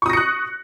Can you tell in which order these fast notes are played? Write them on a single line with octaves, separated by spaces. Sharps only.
C#6 D#6 A#6 C#7 F#6